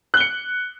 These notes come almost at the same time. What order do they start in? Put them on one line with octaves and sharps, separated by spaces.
F#6 G7 C#7